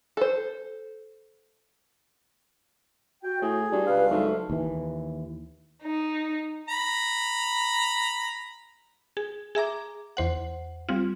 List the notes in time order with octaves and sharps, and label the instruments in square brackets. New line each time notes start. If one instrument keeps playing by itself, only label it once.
[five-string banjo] A4 C5
[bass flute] F#4 [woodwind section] G5
[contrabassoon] A2 [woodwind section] G#4
[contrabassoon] G2 [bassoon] D4 [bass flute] F#4
[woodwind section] C#2 G3 F5 [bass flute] B4
[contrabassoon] G#2 [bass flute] F#3 [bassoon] A3
[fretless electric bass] D#2 E3
[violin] D#4
[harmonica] A#5 B5
[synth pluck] G#4
G#4 E5 A#5 D6
E2 C5 F#5
G3 C4 F4